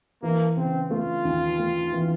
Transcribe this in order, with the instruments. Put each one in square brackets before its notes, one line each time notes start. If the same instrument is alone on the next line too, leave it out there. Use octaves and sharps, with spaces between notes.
[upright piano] E3 [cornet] A#3
[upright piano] C#3 [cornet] C4
[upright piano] A3 [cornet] F4
[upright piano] D#2
A3
E3